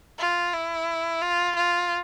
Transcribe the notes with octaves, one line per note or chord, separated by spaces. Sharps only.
F4
E4
F4
F4